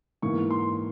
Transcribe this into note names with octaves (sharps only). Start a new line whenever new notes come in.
G#2 E3 A#3 C#6
C6